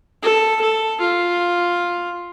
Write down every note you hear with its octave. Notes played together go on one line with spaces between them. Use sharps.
A4
A4
F4